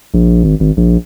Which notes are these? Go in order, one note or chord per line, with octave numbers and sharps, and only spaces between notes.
A#1
G#1
G#1
A#1